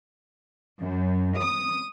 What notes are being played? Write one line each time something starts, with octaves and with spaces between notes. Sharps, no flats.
F#2
D#6